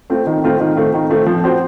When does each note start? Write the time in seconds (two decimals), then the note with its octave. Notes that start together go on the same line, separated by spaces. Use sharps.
0.10 A3 C4 F4
0.27 D#3
0.44 A3 C4 F4
0.60 D#3
0.76 A3 C4 F4
0.94 D#3
1.10 A3 C4 F4
1.26 F3
1.44 C4 F#4 C5